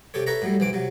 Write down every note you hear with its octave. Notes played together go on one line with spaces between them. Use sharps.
C3 G4 A4 C#5
A4 B4 C#5 E5 A#5 B5
A2 F#3 G3
B1 E3 C4 D6
C3 F#3